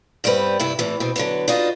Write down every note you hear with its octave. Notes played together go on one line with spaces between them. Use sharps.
G2 G3 B3 C4 B4
G2 C3 E4
E2 A2 C3 E3
B2 E3 C4
D3 F#3 B3
D4 D#4 F4 F#4 B4 D#5